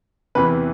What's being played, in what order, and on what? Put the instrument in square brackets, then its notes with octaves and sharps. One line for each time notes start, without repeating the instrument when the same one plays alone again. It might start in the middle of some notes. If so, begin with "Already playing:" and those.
[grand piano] E2 C3 E3 B4